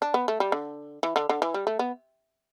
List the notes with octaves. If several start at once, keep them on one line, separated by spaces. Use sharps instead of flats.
D4
B3
A3
G3
D3
E3
D3
D3
E3
G3
A3
B3